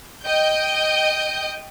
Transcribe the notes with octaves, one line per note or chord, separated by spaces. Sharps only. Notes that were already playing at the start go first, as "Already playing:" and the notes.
D#5 G5 G6